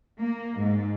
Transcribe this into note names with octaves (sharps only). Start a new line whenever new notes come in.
A#3
G#2